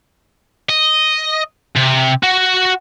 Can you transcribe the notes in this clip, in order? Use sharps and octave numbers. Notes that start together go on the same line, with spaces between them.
D#5
C3
F#4